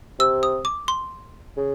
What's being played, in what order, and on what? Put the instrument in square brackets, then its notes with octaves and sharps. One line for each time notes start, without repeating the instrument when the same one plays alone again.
[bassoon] C3 [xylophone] E6
[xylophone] D#6
D6
C6
[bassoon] C#3